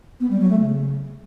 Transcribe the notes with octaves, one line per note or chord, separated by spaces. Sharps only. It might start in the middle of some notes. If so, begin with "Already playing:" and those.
B3
G3
F#3
A3
C#3